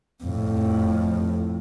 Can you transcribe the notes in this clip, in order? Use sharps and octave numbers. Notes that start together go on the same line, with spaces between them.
F2 A2